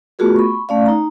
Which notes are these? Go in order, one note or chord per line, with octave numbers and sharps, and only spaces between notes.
A3 B3 F4 F#4 G#4 A#4
B5 C#6
A3 C#4 D5 F5
D#4 A#5